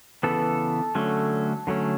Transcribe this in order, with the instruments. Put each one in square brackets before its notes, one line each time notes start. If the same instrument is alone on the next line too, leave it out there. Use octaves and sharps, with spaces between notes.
[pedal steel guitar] C#3 E3 B3 A4
D3 F#3 A3 C#4
D3 F#3 A3 C#4